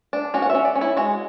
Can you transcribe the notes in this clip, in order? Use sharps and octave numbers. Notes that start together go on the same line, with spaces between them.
D4
C#4 F#4
F#5
C#4 E5
D5
C#4
E4
G#3 F#4